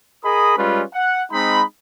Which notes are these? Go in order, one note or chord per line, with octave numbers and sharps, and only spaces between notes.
G#4 A#4 D#5 B5 D#6
G3 G#3 C#4 F4 B4
F#5
G#3 C4 D#4 B5